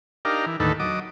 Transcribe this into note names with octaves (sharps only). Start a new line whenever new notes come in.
D4 D#4 G4 A#4 F5
E3
D#2 A2 D3 D#3 A4 B4
F#3 D#5 D6